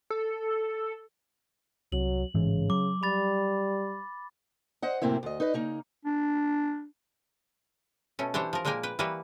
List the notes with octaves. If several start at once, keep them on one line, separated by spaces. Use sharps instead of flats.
A4
C2 F#3 F#7
A1 G#2 C#3 E3
F#3 D6
G3 B5 A6
C5 D#5 F#5
F#2 A2 C3 A#3 C4 E4
D2 D#5
D#4 B4 D#5
C#3 A#3 D#4
D4
B2 A3 C#4
E3 D4 G4 C5 C#5
F3 A#4
A#2 G#3 A#3 A#4 G5 G#5
B4 G5
E3 G3 A#3 B4 C#5